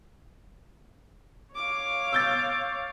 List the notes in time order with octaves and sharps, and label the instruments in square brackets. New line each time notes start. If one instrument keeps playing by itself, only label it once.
[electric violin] C#5 F5 [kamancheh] D6
[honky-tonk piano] E6 G6 A6